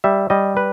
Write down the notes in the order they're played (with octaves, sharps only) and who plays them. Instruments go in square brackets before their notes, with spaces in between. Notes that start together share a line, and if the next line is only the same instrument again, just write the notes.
[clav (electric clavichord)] G3 E5
G3 D#5
B4